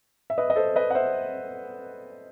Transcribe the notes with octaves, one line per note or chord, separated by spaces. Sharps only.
E5
B4 D#5
D#5
A4 C5
B4 D#5
F#5
C5 E5